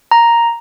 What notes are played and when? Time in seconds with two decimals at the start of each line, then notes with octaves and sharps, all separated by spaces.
0.11 A#5